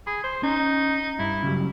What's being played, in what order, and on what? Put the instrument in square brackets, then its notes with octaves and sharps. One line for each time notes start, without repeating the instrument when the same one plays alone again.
[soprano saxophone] G#4 [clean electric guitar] B5
[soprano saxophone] C5
[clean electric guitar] C#4 [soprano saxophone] D#4
[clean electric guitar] G2 [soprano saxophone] E4
[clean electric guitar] C#3 F#3 G3